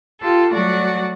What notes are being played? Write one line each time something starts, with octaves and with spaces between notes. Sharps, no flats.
F4 G4 A4
F#3 G3 A3 F#4 D5 F#5